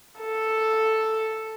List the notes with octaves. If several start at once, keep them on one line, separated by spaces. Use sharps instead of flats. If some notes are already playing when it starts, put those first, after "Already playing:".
A4